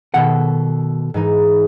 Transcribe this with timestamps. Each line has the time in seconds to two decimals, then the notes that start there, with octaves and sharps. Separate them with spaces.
0.14 B2 D#3 A4 F#5
1.14 G#2 E3 D#4